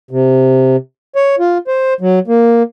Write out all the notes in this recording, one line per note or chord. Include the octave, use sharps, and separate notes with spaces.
C3
C#5
F4
C5
F#3
A#3